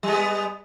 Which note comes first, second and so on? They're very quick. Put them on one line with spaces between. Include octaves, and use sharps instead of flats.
G3 G#3 B3